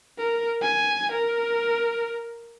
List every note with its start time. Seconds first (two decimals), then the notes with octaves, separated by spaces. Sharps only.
0.18 A#4
0.62 G#5
1.12 A#4